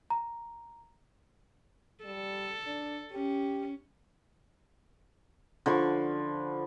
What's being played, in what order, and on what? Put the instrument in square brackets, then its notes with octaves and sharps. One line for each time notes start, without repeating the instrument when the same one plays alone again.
[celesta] A#5
[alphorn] G3 [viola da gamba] A4
[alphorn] D4
[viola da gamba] C#4 [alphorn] G4
[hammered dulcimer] D3 F3 B5 C#6